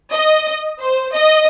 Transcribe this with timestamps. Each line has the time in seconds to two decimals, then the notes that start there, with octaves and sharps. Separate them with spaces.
0.12 D#5
0.80 C5
1.14 D#5